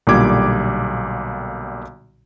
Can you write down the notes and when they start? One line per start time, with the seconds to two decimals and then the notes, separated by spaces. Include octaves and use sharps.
0.07 B1 A#2 D3 G3 D6 G#6